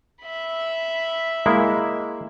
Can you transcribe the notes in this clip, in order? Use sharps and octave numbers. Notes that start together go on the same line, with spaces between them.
E5 B5
G#3 A#3 E4